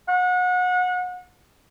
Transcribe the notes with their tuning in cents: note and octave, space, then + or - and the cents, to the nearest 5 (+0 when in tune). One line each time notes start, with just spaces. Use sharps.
F#5 -30